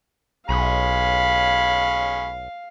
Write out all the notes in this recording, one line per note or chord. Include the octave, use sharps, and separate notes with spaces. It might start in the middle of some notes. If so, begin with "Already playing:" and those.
B1 G#3 C#4 F5 B5